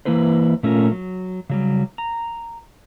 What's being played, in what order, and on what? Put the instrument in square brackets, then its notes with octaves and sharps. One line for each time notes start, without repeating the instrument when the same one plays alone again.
[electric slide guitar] E3 A#3 E4 B4 C5
A#2 A3 C#4 F4 A#4
F#3
C#3 F#3 G3
A#5